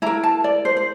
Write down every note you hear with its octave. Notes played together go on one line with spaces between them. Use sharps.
E4 A#4 A#5
A5
D5
C5
C5